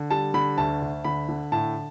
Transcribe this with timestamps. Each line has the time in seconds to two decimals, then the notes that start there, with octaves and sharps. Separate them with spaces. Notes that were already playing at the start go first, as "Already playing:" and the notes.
Already playing: D3
0.10 G3 A5
0.34 D3 B5
0.58 D2 A5
0.82 D2
1.04 D3 B5
1.29 D3
1.52 A2 A5